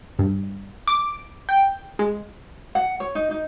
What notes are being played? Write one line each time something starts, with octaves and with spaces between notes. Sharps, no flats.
G2
D6
G5
G#3
F#5
C#5
D#4
D#4